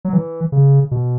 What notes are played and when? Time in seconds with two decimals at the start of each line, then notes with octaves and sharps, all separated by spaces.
0.05 F#3
0.13 E3
0.52 C#3
0.91 B2